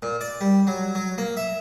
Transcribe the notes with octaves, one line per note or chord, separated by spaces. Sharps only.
A#2
D5
G3
F#3
F#3
A#3
E5